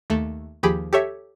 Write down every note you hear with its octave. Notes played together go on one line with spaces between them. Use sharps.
D#2 A3
D#2 F3 G4 G#4 B5
G4 A4 C#5 E5